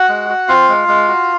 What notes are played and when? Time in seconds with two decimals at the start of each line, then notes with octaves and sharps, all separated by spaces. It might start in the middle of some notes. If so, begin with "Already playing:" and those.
Already playing: F#4 F#5
0.09 G#3
0.29 F#4
0.48 C4 F4 F5
0.69 G#3
0.88 G#3
1.08 F#4